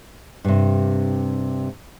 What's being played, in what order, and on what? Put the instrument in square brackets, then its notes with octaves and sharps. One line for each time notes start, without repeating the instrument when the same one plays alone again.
[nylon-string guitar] G2 C3